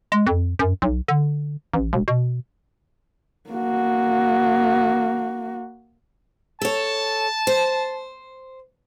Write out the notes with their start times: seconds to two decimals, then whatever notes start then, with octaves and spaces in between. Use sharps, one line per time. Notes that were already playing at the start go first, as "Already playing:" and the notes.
0.12 G#3
0.27 F2
0.59 F#2
0.82 B1
1.08 D3
1.74 A1
1.93 E1
2.08 B2
3.50 A#3 F#4
6.61 A4 C#5 A5
7.47 C5